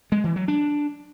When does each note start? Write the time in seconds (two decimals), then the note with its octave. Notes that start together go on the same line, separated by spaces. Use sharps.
0.12 G#3
0.24 E3
0.36 F#3
0.48 D4